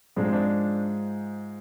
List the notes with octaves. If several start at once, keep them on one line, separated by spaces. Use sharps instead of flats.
G#2 F3 G#3 D4
C4
D4